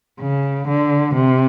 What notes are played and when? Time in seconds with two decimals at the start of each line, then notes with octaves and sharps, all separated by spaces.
0.20 C#3
0.68 D3
1.15 C3